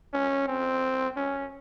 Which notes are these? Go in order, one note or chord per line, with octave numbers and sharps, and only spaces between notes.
C#4
C4
C#4